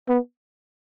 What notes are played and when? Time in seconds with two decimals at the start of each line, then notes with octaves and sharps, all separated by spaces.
0.09 B3